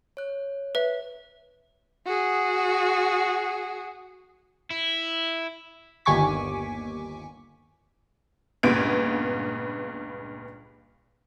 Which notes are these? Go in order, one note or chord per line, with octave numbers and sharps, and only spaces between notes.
C#5 F#6
B4 E5
F#4 G#4
E4
G1 D#2 G#5 C#6 D6 B6
C#2 G2 A#2 B3 G#6 D7